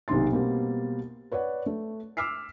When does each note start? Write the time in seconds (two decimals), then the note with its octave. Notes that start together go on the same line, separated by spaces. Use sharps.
0.08 B1 C3 D#3 A#3 C6 A6
0.32 B2 G3 A#3 C4
1.32 B4 C#5 D5 F#5
1.66 A3
2.17 D6 E6 F6 B6 C7